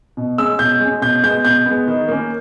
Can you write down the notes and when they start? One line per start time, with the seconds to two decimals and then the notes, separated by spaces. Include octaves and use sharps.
0.17 B2
0.38 G#3 C#4 E6
0.59 B2 G6
0.80 G#3 C#4
1.02 B2 G6
1.23 G#3 B3 G6
1.45 B2 G6
1.66 G#3 B3
1.87 D#3
2.08 A#3 C#4